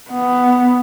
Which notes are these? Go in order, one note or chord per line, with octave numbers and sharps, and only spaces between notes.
B3